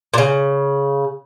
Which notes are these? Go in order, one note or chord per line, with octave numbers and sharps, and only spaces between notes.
A#2 C#3